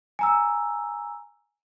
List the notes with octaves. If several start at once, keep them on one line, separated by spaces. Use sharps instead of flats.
G#5 A#5 E6